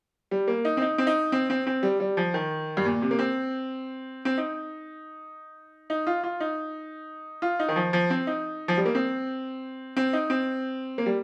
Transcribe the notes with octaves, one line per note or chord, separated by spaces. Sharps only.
G3
A#3
D#4
C4
D#4
C4
D#4
C4
C4
C4
G3
G3
F3
D#3
G2
A#2
C3
A#3
C4
C4
D#4
D#4
F4
F4
D#4
F4
D#4
D#3
F3
F3
C4
D#4
F3
G3
A#3
C4
C4
D#4
C4
A#3
G3